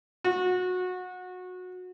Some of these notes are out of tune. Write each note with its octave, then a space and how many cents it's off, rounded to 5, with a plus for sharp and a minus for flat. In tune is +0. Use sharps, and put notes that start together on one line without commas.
F#4 -20